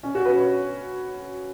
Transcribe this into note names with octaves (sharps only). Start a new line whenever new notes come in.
C#4
F#4
B4
C#5